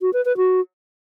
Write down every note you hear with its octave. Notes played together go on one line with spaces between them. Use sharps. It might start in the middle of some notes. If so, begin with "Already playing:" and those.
F#4
B4
B4
F#4